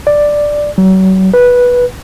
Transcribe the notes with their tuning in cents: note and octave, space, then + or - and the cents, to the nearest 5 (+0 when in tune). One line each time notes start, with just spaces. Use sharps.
D5 +5
F#3 +35
B4 -10